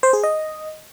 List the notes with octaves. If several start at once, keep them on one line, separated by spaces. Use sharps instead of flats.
C5
G#4
D#5